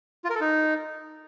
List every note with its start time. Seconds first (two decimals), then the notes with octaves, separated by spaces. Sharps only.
0.25 F4
0.30 A#4
0.35 A4
0.41 D#4